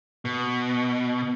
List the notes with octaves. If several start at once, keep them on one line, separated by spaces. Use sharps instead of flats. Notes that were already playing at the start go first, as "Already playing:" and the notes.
B2